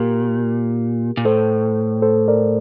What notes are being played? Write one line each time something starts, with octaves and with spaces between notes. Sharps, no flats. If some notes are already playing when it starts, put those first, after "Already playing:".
Already playing: A#2 G4 A#4
A#2
A2 A4 C5
A4 C5
A#4 D5